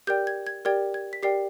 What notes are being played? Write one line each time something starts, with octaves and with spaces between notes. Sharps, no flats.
G4 A#4 D5 G5 G6
G#6
G#6
G4 A#4 D5 G5 G#6
G#6
B6
G4 A#4 D5 G5 C7